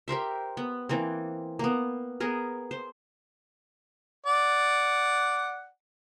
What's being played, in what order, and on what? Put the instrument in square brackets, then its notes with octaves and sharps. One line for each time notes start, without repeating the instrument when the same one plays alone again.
[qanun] G4 A#4 C5 E5
B3
E3 A#3 C4
A#3 B3
B3 G#4 A#4
C5
[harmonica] D5 F#5